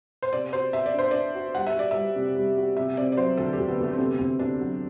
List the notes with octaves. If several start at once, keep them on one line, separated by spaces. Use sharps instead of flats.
C5
C3 D5
F#4 C5
F#4 E5
D5
D4 C5
D4 D5
F#4
G3 F#5
E5
F#4 D5
G3 E5
C3
G3
F#4
C3 E5
C4 D5
D5
F#3 C5
D2 A4
G4
D2
B3
D2 A3
C4
C3 B3
D2 C4
D2 D4
F#3